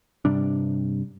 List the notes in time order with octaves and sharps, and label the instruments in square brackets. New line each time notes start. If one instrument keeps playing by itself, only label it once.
[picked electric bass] G2 C3 G3 D4